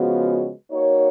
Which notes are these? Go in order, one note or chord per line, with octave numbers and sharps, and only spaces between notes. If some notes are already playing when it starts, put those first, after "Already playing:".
Already playing: C#3 F3 G#3 B3 F#4
A#3 D#4 F#4 C#5